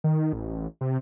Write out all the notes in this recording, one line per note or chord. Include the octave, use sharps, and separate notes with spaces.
D#3
A1
C3